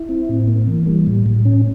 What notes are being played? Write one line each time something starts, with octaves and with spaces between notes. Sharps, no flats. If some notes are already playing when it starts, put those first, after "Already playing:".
Already playing: E4
C4
A2
A#3
E3
G3
A2
A2
C#4